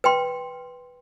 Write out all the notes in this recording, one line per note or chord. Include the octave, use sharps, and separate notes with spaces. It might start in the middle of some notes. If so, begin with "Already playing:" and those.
B4 G5 C6